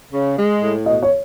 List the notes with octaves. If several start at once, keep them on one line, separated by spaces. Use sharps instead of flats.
C#3
G#3
A2
B2 D#5
C#5